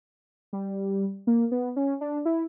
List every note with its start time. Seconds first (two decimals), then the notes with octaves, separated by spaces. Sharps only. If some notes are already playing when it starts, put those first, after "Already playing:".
0.53 G3
1.27 A#3
1.51 B3
1.76 C#4
2.01 D4
2.25 E4